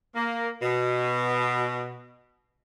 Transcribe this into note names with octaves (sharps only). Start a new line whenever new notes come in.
A#3
B2